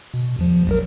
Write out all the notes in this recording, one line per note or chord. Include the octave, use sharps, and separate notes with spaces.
B2
E2 F3
A#1 F#3 A#4